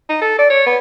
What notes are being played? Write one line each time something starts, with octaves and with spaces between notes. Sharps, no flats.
D#4
A4
D5
C#5
B3